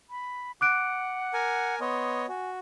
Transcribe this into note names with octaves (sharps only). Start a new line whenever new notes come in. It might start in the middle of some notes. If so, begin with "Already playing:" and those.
B5
F#5 D6 F#6 D7
A#4 G#5
B3 C#5 D#5 C6
F#4 G#5